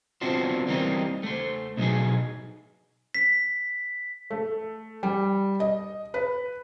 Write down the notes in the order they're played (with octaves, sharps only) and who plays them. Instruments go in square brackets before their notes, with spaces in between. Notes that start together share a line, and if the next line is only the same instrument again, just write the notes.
[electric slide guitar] B3 C4 D4 F4 F#4 C5
E3 G3 A#3 C4 D#4
A3 C5
B2 F#3 B3 D#4 G#4
[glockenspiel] B6
[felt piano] A3
G3
D#5
B4